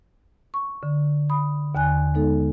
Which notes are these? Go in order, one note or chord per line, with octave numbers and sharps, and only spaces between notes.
C#6
D3
B5 D#6
D#2 D3 G#5 F#6
G#3 B3 D#4 A4